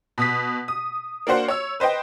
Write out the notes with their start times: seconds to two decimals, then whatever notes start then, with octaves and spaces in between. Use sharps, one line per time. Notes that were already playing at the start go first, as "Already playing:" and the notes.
0.18 B2 D#6 B6
0.68 D#6
1.27 A#3 D4 F#4 C5 F#5
1.48 C#5 E6
1.80 B4 C5 D#5 G5